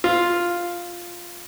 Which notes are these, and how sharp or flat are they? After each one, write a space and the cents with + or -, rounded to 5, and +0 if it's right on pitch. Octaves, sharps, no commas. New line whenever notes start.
F4 +0